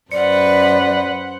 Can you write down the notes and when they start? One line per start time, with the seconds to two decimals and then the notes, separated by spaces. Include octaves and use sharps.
0.12 F#2 B4 C5 D5 F#5 C#7